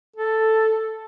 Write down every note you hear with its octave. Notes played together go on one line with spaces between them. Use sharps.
A4